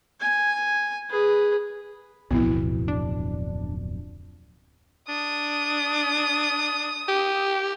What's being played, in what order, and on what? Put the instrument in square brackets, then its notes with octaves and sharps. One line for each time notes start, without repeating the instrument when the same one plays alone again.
[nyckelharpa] G#5
G#4 B4
[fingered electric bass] D1 F2 B2 [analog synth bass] B1 [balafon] B3 E4
[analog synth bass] D4
[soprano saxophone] D4 [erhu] D#6
[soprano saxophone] G4